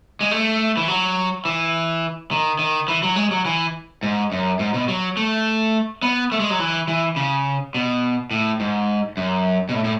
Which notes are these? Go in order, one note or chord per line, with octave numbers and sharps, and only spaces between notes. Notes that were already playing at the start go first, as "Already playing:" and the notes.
G#3
A3
E3
F#3
E3
D#3
D#3
E3
F#3
G#3
F#3
E3
G#2
F#2
G#2
B2
F#3
A3
B3
A3
G#3
F#3
E3
E3
C#3
B2
A2
G#2
F#2
B2
A2
A2